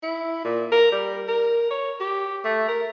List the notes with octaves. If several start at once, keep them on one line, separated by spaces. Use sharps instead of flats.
E4
A#2
A#4
G3
A#4
C#5
G4
A3
A#4